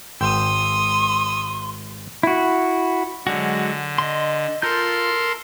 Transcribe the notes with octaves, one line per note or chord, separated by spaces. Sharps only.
G#1 G5 C6 D#6 E6
E4 F#4
D3 F#3 G#3 F#4
D#5 C6
F4 A4 A#4 C6 G6